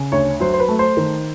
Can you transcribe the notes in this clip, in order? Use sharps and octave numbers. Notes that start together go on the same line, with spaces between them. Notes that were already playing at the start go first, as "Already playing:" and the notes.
Already playing: C#3
D2 C#5
F#3 C5
C5
B4
A3
C5
D#3